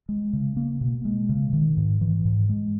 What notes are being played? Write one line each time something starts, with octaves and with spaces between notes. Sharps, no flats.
G#3
C#3
A#3
B2
G#3
C#3
D#3
G#2
E3
G#2
G#3